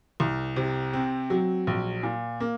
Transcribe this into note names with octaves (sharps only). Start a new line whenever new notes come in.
C2
C3
C4
F#3
A#1
A#2
A#3